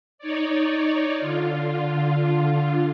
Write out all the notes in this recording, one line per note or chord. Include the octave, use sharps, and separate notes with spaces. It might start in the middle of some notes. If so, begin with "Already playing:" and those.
D#4 C#5 D5
D3 F4